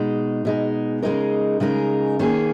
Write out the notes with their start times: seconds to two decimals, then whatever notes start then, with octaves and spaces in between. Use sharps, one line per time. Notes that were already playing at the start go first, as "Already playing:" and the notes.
Already playing: B2 G#3 D#4
0.45 B2 G#3 D#4
1.02 C#3 G#3 D#4 A#4
1.60 C#3 G#3 D#4 A#4
2.19 D#3 A#3 C#4 G#4